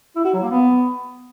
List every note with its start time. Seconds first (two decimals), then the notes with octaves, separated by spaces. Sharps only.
0.16 E4
0.25 F#4
0.33 F#3
0.42 A#3
0.51 B3